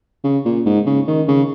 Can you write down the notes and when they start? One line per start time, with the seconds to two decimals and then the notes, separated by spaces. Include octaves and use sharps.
0.24 C#3
0.45 A#2
0.66 G#2
0.86 C#3
1.07 D#3
1.28 C#3